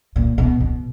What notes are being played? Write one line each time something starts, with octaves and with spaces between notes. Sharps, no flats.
A#2
B2
B2